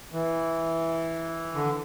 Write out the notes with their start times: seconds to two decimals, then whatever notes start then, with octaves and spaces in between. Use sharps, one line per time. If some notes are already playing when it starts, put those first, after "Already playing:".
0.13 E3
1.55 D3